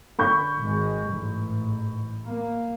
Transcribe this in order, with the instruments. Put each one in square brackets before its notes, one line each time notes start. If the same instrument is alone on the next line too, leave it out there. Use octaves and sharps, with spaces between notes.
[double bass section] D3 [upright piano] B5 C#6 G6
[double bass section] G#1 G#3
A1 G#2
A#3